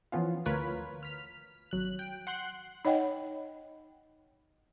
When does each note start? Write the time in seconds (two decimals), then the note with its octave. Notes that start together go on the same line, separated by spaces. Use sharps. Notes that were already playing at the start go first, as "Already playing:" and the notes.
0.12 E3 F3 B3 C#4 F4
0.46 D2 F4 A#4 B4 C#5 B6
1.03 F6 B6
1.71 G#1 F#3 F#6
1.99 G5
2.27 F#5 C6 F#6
2.85 D#4 C#5 D#5 F#5 G5